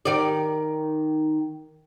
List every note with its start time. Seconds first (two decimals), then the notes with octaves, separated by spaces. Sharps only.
0.05 D#3 D5